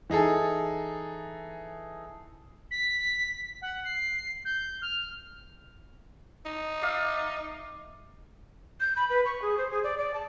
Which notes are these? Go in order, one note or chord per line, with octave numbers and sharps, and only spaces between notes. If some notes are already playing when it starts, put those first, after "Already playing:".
E3 D#4 G#4 A4
B6
F#5
C7
G6
F6
D#4
D5 E5 F5
G6
B5
B4
C#6
G#4
C5
G#4
D5
D5
A5